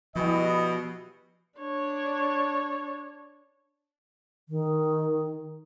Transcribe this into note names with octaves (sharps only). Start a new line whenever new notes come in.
B2 F3 G3 E4 G#4 D#5
D4 C#5
D#3